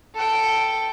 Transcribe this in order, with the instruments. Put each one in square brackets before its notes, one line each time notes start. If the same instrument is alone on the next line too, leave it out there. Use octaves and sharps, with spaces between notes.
[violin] A4 G5